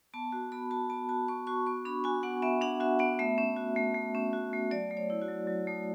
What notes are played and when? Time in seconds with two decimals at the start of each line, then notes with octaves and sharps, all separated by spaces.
0.14 B3 A5
0.32 F#4
0.52 B3 B5
0.71 F#4 A5
0.90 B3 A5
1.09 F#4 A5
1.28 B3 C#6
1.47 F#4 C#6
1.66 B3 C#6
1.85 D4 B5
2.04 F#4 G#5
2.23 B3 F#5
2.42 B3 E5
2.61 D4 F#5
2.80 F#4 E5
2.99 B3 F#5
3.19 A3 E5
3.38 C#4
3.56 F#4
3.76 A3
3.95 A3
4.15 C#4
4.33 F#4
4.53 A3
4.71 F#3 D5
4.91 A3
4.97 C#5
5.10 E4
5.22 F#4
5.28 F#3
5.47 F#3
5.67 A3